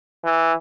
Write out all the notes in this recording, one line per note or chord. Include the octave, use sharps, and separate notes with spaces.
E3